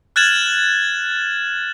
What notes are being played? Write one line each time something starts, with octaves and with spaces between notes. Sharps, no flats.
F6 F#6 G#6 A6 E7 F#7